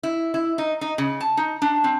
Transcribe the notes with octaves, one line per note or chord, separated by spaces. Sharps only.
E4
E4
D#4
D#4
C#3
A5
D#4
D4
C4